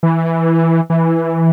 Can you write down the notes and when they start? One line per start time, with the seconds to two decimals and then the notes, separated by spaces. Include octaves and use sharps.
0.03 E3
0.90 E3